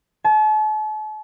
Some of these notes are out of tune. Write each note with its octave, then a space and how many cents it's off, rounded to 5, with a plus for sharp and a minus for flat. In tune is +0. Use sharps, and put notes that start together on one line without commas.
A5 -40